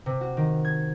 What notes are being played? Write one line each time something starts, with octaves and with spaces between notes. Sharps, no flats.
C3
F#4
D#3
G#6